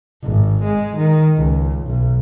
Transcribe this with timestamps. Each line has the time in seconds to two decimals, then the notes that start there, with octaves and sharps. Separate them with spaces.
0.23 G#1
0.64 G#3
0.97 D#3
1.36 C#2
1.86 B1